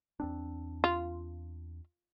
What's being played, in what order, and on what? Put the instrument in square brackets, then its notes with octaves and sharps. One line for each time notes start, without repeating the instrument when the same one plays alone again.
[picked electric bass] E2 C4 D4
[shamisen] F4